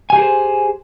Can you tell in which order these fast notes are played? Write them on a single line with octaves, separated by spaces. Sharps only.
G#5 G4 G#4 A#4 C5